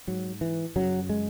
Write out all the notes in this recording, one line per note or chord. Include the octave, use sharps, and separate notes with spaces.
G#2 F#3
E3
F#2 C#3 F#3
G#3